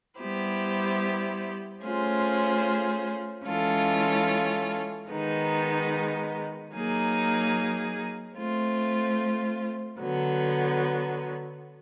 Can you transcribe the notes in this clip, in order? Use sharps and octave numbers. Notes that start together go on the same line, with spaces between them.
G3 B3 E4 G4 C5
A3 C#4 F4 G#4 C5
E3 G#3 C#4 F4 A4
D#3 G#3 B3 D#4
F#3 A#3 D#4 G#4
A3 C4 F4
D3 F#3 B3